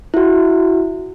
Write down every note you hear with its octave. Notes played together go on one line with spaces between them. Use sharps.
E4 F#4